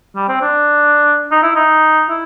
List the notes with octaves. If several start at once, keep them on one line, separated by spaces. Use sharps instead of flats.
G3
C4
D4
D#4
E4
D#4
E4